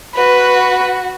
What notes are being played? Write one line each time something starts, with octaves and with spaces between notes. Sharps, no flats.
F#4 B4